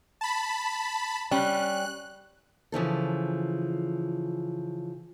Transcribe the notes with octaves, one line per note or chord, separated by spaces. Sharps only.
A5 B5
G3 C#4 F#6
C#3 E3 F3 A4